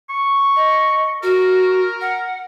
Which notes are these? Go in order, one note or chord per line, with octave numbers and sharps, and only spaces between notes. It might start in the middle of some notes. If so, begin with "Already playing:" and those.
C#6
D#5
F#4 A#4
F#5